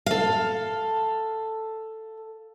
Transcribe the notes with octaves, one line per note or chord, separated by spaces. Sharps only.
A4 F5